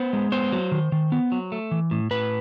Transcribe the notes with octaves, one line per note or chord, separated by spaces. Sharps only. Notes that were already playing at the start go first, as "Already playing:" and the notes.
Already playing: B3 C5
G#3
B3 C5
F#3
D#3
D#3
B3
F#3
A3
E3
A2
A2 B4